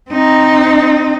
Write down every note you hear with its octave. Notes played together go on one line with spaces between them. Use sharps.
C4 D#4